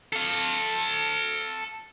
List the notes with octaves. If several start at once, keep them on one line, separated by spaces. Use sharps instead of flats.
A4 F5